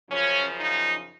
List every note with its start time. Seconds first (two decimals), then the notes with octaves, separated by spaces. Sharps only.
0.10 F#2 C#3 F3 C#4
0.60 D#4